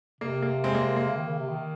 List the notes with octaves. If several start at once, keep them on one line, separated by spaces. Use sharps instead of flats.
C3 A#3
A#3
G#3 C4
A#3
A#3
C#3
D#3
C#3
C3
D#3